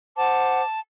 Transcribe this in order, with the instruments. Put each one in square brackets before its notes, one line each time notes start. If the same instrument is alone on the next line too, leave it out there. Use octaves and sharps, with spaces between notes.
[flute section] C5 F#5 D6 [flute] A5